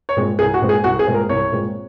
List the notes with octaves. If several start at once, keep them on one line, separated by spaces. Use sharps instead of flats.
C#5
A#2 G#3 C4
C2 G#4
F#4
A#2 G#3 C4
G#4
C2 F#4
G#4
A#2 G#3 C4
A#4
C2 C#5
A#2 G#3 C4